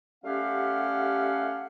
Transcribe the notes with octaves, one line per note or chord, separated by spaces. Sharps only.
G3 A3 C#4 G4 F5 F#5